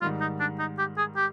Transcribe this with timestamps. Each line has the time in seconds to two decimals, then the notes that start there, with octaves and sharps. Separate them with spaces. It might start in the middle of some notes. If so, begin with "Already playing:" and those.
0.02 G#2 D#3 G3 F4
0.21 D#4
0.40 D4
0.59 D#4
0.79 G4
0.98 G#4
1.17 G4